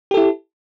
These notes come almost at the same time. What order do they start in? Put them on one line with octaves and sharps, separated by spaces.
G4 A4 E4